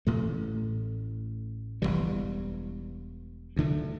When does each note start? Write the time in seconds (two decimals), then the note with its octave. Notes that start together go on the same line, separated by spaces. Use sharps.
0.07 A1 A2 A3
1.82 E1 E2 E3 G3
3.56 D2 D3 A3